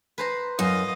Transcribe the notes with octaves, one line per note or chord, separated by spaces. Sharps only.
B4 C5 A#5
F#2 D#5 F5